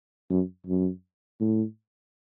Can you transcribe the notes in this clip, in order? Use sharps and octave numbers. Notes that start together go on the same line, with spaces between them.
F#2
F#2
A2